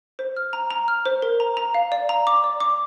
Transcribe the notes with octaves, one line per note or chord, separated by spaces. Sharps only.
C5
F6
A#5
A#5
F6
C5
A#4
A#5
A#5
F5
D5
A#5
D6
D5
D6